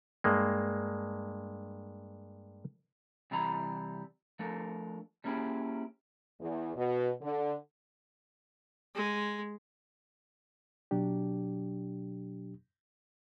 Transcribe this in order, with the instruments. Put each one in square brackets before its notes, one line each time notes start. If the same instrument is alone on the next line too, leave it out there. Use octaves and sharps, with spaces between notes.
[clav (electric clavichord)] G2 G#3 A#3
[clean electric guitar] C3 E3 G3 E4 A#5 B5
F3 A3 D4 A4 A#4
G3 A#3 C#4 E4 G4 G#4
[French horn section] E2
B2
D3
[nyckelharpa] G#3
[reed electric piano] B2 F#3 D4 G4